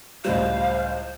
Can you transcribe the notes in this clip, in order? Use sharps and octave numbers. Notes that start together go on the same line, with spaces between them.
C#2 A2 G3 C5 F5